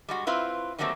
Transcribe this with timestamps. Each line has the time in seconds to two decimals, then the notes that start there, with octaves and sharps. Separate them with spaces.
0.08 G3 G#3 F#4
0.27 C4 E4 F4 B4
0.78 D#3 F#3 G3 A3 A#3 C4